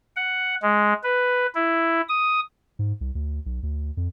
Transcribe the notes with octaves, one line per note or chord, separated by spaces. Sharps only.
F#5
G#3
B4
E4
D#6
G#2
C2
D2
B1
D2
F2